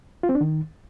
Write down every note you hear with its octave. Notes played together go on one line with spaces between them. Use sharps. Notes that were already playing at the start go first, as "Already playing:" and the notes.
F4
C4
D4
D#3